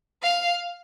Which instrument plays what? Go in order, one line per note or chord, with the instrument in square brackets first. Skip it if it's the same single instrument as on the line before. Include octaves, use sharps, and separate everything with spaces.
[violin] F5